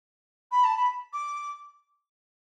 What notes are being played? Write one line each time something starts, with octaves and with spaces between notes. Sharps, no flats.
B5
A5
B5
D6